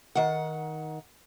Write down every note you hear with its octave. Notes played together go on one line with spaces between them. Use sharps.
D#3 F#5